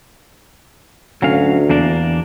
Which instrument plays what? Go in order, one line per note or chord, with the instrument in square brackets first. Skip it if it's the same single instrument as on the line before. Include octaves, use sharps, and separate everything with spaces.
[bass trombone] D2 [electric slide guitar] F#3 C#4 F5
[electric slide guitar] E2 A#3 D4